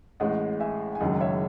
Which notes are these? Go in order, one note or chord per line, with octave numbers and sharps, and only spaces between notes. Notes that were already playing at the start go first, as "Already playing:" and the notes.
A1 A2 G#3 D#5 F#5
E5 G#5
G#5
F#1 F#2 D#3 G#3 D#5 F#5
C#5 E5